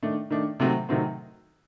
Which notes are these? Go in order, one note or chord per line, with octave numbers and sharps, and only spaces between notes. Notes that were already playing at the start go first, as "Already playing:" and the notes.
D#3 A3 D4
D#3 A3 D4
C3 D#3 F#3 A3 C4
C3 D#3 F#3 A3 C4